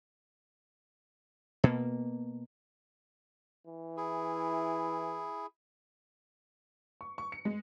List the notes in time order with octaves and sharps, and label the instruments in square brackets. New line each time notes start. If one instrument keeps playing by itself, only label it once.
[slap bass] B2 A#3
[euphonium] E3
[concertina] E4 G#4
[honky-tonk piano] C#6
C#6
C#7
G#3